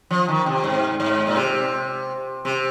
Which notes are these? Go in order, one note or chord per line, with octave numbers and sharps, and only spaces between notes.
F3
D#3
C3
G#2
G#2
A#2
C3
C3